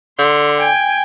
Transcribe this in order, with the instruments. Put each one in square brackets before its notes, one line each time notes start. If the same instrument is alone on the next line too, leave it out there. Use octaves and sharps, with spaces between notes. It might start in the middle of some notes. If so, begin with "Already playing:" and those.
[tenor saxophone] D3 [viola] C6
[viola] G5 G#5